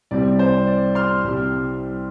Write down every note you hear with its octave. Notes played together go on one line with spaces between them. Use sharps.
C2 C3 G3 C4 D5
C5
D5
C6 F6
C2 C3 G3